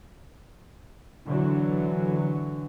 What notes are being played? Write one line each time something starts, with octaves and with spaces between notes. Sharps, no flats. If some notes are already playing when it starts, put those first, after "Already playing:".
D3 E3 F#3